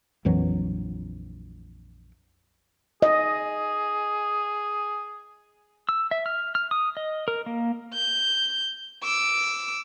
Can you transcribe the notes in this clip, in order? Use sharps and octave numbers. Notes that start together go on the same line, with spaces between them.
A#1 F2 E3 F#3
G#4 D#5
E6
E5
F6
F6
D#6
D#5
A#4
A#3
G6
D6 E6